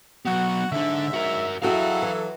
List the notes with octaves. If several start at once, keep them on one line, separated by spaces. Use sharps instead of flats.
F#3 B3 F#4 F#5
G#2 D3 D4 E5
F#4 A#4
F#3 E4 F#4 G#4 A4 F5 G5
E3